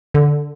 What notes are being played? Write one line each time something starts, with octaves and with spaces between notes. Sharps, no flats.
D3